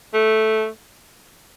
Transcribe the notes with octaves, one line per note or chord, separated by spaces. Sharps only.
A3